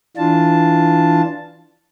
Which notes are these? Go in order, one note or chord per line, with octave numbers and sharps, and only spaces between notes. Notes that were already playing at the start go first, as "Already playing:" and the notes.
E3 D4 F4 A5